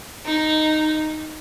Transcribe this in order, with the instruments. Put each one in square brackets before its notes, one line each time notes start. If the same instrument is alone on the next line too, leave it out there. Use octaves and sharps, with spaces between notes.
[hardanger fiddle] D#4